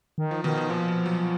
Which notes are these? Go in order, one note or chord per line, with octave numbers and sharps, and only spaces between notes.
D#3
F3
B2 D#3
B2
A#2 F3
B2
F#3